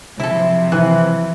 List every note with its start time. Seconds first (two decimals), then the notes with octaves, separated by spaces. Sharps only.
0.20 C3 F3 F#3 E4 A4
0.72 E3 E4 F#6